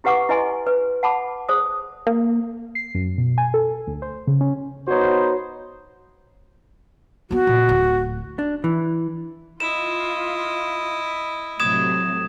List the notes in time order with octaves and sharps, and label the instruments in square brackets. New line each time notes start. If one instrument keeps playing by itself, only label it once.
[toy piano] E4 G4 B4 F#5 C#6 D6
E4 B4 D#5 G#5 C6
B4
F#5 A5 B5 D6
G#4 C5 D#6
[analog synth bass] A#3
[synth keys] C7
F#2
B2
G#5
A4
D2
C5
C#3
C#4
[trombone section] B3 D#4 C5 [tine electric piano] F#4 C#5
[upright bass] E3 B3 [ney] F#4
[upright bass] A#2
D1 D2
[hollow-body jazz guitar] D4
E3
[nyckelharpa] E4 D#5 [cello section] F4 [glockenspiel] E7
[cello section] A2 C3 F#3 [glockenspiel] D#6 G#6 E7